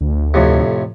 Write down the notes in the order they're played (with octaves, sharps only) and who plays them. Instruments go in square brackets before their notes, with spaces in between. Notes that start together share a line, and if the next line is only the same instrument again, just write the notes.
[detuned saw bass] D2
[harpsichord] F2 A2 C3